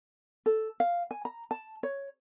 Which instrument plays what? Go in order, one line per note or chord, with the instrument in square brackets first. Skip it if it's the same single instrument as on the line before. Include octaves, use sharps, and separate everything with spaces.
[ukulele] A4
F5
G#5
A#5
A5
C#5